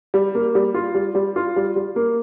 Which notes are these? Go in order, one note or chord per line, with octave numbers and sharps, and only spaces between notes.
G3
A#3
G3
F4
G3
G3
F4
G3
G3
A#3